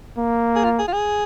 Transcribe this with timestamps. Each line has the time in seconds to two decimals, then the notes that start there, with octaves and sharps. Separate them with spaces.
0.18 A#3
0.56 G#4
0.64 F4
0.79 G#4
0.88 F4
0.93 G#4